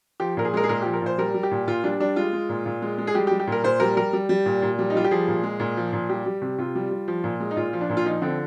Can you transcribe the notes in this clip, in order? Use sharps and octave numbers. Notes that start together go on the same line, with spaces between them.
F3 G4
A#2 A#4
G#4
G#3 A#4
G#4
A#2 A#4
F3 G4
A#4
A#2 C5
G3 A#4
G3
G4
A#2
A#2 F4
G3 D4
G3 D4
G#3 F4
G#3
A#2
A#2
G#3
G#3
G#4
G3 G4
G4
G3
G4
A#2 A#4
A#2 C5
G3 A#4
G3 A#4
G3
G3
A#2
A#2
G3
D#4
G3 F4
G4
F3 G#4
A#2
G#3
A#2
F3
A#2
G3 G4
G3
C3
C3 F4
G3
G3
F3
A#2
G#3
D#4
A#2 F4
F3
D4
A#2
F4
F3 D#4
D3 C4